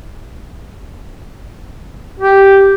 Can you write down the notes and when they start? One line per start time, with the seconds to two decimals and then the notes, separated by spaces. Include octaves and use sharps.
2.20 G4